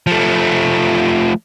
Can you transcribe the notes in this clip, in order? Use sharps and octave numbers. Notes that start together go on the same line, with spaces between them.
F3 A3